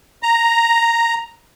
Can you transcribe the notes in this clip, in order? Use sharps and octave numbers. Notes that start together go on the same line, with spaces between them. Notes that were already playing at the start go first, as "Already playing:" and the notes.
A#5